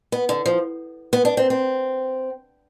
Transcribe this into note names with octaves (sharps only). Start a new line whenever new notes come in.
B3
D3
F3
B3
D4
C4
C4